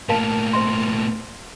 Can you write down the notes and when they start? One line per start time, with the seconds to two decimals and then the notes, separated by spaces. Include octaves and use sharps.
0.09 A2 A#3 A#4 F5 A5
0.53 C5 E5 C6